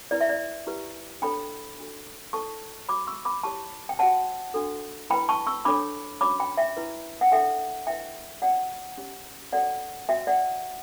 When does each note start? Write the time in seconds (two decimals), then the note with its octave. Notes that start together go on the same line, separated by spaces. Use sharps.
0.11 E4 B4 D5
0.21 E5
0.29 D5
0.67 E4 G4 B4
1.22 D4 A4 C#5 G5 B5
1.78 D4 F#4 A4
2.33 E4 A4 C#5 A5 C#6
2.88 F#4 C#5 B5 D6
3.07 C#6 E6
3.25 B5 D6
3.43 E4 G4 C#5 A5 C#6
3.89 G5
3.99 F#4 C#5 F#5 A5
4.54 D4 F#4 A4
5.10 E4 G5 B5
5.13 B4
5.29 A5 C#6
5.47 C#6 E6
5.65 D4 A4 C#5 B5 D6
6.21 C#4 F#4 C#5 B5 D6
6.40 G5 B5
6.57 E5 G5
6.77 E4 B4
7.21 F#5
7.31 D4 A4 C#5 E5 G5
7.87 E4 B4 E5 G5
8.42 C#4 F#4 C#5 D5 F#5
8.98 C#4 G4 C#5
9.52 C#4 F#4 A4 C#5 D5 F#5
10.09 F#4 C#5 E5 G5
10.27 D5 F#5